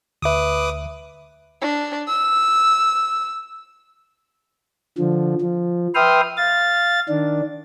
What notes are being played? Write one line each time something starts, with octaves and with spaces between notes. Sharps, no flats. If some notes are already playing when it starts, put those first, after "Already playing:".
D2 B4 E5 D6 D#6
D4
E6
D3 F3
F3
B4 E5 G5 C6 D#6 F6
F5 A6
D#3 D4